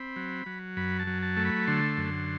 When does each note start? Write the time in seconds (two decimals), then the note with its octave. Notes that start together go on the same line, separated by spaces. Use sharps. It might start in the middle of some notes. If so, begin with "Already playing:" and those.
Already playing: C4 B5
0.16 F#3
0.46 F#3
0.77 F#2 B5
0.99 A5
1.07 F#3
1.22 A5
1.37 A3
1.45 B5
1.67 D3 C6
1.97 F#2